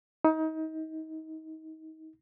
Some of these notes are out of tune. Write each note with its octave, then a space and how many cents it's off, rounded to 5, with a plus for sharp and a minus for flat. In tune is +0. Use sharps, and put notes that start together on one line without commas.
D#4 +30